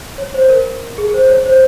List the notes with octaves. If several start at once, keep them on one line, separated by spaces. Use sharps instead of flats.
C#5
C5
A#4
G#4
C5
C#5
C5